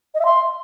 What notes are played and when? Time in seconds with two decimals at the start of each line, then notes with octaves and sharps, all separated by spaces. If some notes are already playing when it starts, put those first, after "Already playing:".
0.14 D#5
0.19 E5
0.25 C6